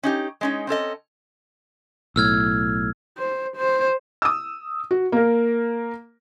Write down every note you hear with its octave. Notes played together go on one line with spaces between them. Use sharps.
C#4 D#4 G4
G#3 C#4 D#4
C4 C#4 A4 D#5
B1 A2 E6 F6 G#6
C5
C5
D#6 E6
F#4
A#3 A#4